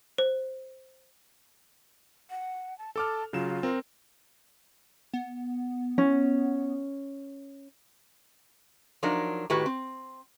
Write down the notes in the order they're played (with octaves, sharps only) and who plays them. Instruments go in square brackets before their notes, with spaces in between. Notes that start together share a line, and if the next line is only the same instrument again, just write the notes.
[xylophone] C5
[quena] F#5
A5
[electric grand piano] A4 D6 F6 [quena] A5
[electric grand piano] C#3 F#3 E7 [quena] F4
[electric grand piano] C4 A#4
[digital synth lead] B3
[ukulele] C#4
[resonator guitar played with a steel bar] F3 F#3 D4 D#4 A#4
A2 D#3 F#4 G4 B4
C4